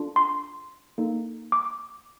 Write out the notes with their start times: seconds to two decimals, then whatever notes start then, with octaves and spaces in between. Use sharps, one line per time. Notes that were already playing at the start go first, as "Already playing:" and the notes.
Already playing: D4 F4 A4
0.16 C6
0.98 A#3 D#4 A4
1.52 D6